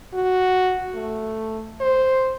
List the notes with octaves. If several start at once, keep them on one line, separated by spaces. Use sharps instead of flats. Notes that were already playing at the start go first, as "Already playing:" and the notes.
F#4
A3
C5